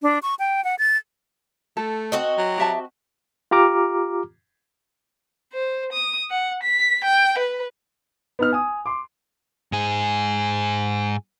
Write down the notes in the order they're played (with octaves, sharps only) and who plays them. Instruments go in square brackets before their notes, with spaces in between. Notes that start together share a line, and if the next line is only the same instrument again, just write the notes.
[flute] D4
C#6
G5
F#5
A6
[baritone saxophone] A3 [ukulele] A4
[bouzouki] C4 F#4 D#5
[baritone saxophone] F#3
[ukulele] G4 E5 A5
[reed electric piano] F4 G4 A#5 D6 F6
[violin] C5
D#6
F#5
B6
G5
B4
[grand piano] B3 D#4 F6
G#5 D#6
C6 D6
[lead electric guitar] G#2 G#4